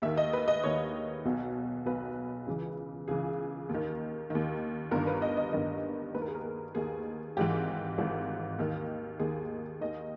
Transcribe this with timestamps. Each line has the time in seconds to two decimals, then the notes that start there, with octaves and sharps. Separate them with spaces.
0.02 D#2 D#3 E5
0.17 D#5
0.33 B4
0.48 D#5
0.64 D#2 D#3 C#5
1.25 B1 B2
1.86 B1 B2 B4
2.47 C#2 C#3 E3
3.08 C#2 C#3 E3 G#4
3.69 D#2
3.74 D#3
4.30 D#2 D#3
4.91 G1 G2 D#3 A#4
5.07 B4
5.22 D#5
5.37 D#5
5.52 G1 G2 D#3 D#5
6.14 D#2 D#3 B4
6.22 A#4
6.28 G#4
6.35 A#4
6.75 D#2 D#3 G#4
7.37 G#1 G#2 E3 G4
7.98 G#1 G#2 E3
8.59 D#2 D#3
9.20 D#2 D#3 G#4
9.81 D#2 D#3 D#5